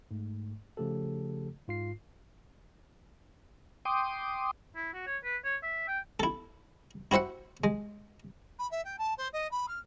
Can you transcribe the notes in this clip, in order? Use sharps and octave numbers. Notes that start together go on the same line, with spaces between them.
G#2 A3
C#3 F3 A3 G4 A4
G#2 F4 C7
G5 C6 D6 D#6
E4
F#4
C#5
B4
C#5
E5
G5
E4 A4
E4 F#4 C5 E5 F#5
G#3
B5
E5
G5
A5
C5
D#5
B5
F6